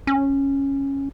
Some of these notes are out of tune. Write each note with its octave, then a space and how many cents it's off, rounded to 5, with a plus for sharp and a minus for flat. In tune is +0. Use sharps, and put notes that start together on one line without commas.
C#4 -10